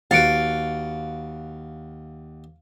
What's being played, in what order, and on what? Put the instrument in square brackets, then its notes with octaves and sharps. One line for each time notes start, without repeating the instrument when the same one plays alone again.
[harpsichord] D#2 F#4 B4 [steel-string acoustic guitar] F5 [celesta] A6 C#7 D7